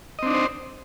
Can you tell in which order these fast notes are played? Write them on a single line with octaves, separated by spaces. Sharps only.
D#5 C4 D4 D#4 C5